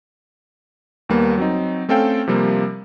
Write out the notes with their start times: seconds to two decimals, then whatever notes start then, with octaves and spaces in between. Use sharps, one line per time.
1.09 D#2 G3 A#3 B3
1.38 F#3 C4 D#4
1.89 A3 C4 C#4 A4 F5 G5
2.28 C3 F3 G3 A#3